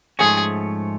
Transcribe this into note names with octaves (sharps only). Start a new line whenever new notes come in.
G#2 F3 A3 C#4 G#4